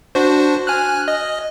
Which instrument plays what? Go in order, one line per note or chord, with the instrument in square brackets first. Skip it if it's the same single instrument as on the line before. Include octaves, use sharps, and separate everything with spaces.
[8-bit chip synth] D4 F#4 C5
G#5 F6 F#6
D#5